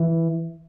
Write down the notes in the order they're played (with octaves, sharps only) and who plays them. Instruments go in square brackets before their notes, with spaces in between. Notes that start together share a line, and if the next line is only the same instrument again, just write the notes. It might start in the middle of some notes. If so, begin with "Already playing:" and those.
Already playing: [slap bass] E3